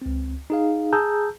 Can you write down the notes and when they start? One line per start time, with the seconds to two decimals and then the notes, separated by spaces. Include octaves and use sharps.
0.02 C#2 C4
0.50 D#4 G#4 F5
0.93 G#4 A5 A#5 E6 G6